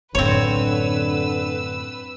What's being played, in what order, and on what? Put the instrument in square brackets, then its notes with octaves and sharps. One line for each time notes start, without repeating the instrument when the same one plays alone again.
[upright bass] F#2 A2 [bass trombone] D3 [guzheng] C4 C#5 [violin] B4 E6